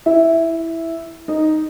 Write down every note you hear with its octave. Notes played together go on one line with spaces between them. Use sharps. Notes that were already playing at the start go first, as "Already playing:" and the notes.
E4 E5
D#4 D#5